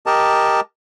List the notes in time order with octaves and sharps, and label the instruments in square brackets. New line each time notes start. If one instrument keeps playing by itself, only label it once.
[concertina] G4 A#4 D#5 A5